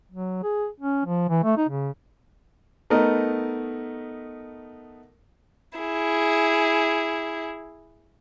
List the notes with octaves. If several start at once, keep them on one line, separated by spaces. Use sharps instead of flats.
F#3
G#4
C#4
F3
E3
A3
D#4
C#3
A3 B3 D#4 A#4 D#5
E4 G#4